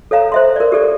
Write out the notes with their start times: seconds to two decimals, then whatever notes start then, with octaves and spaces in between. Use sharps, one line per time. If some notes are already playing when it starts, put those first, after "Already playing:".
0.11 A4 C#5 F5 A#5
0.32 C5 E5 C6
0.56 A#4 D5
0.72 G4 A4 D5